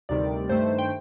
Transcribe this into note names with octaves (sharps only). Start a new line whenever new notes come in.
D2 C3 D#3 G3 D5
G2 D#3 A3 C5
G5